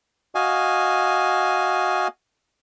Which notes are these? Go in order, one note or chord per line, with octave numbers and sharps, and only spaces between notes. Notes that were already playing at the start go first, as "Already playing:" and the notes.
F#4 D#5 F5 G#5